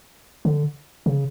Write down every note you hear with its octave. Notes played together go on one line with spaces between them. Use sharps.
D3
C#3